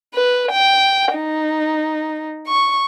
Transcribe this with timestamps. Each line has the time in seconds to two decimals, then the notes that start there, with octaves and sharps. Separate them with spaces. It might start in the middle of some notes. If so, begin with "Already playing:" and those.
0.14 B4
0.51 G5
1.14 D#4
2.48 C#6